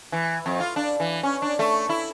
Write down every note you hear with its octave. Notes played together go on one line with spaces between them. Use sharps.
E3
F2
F4
D4
E3
C#4
D4
A3
E4